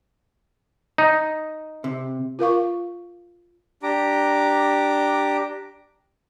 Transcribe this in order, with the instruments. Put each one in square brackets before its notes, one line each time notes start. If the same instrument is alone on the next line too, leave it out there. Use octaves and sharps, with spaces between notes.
[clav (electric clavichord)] D#4
[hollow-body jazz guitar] C3
[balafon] F4 A#4 F5 C#6
[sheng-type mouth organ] D4 G4 A#5 D6